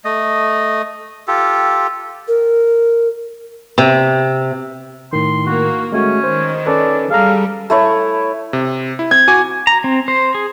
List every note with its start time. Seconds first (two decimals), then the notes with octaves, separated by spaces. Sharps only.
0.05 A3 D#5
1.28 F4 G4 A4
2.28 A#4
3.78 C3
5.13 A2 D#3 C6
5.46 A#3 F#4
5.92 G#3 A3 C#4 F#4
6.24 D#3 C5
6.66 C#4 A4 B4 D5
7.10 G3 G#4 A4 F5 A#5
7.70 A3 E4 C#5
8.53 C3
8.99 E4
9.11 C4 G#6
9.28 F#4 G#5 D6
9.67 A#5
9.84 C4
10.08 C5
10.35 G#4